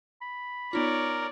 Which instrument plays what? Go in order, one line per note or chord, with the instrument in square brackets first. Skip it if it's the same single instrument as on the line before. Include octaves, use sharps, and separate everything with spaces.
[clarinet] B5
[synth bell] B3 D#4 F4 [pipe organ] A#4 [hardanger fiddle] C#5 D5